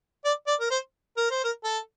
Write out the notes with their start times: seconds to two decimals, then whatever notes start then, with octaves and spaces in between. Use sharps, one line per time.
0.25 D5
0.47 D5
0.60 A#4
0.71 C5
1.17 A#4
1.31 C5
1.44 A#4
1.64 A4